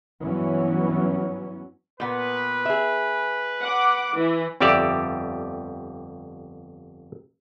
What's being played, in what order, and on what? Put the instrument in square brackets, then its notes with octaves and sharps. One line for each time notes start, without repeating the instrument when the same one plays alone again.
[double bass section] G2 E3 F#3 B3 C#4
[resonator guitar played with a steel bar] A#2 B3 [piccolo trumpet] B4
[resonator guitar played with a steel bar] G#4 E5
[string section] F#5 D6
E3
[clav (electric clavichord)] G1 F2 G3 G4 D5 E5